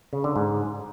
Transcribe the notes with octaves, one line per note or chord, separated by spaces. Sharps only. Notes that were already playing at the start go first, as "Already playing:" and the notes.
C#3
D3
G#2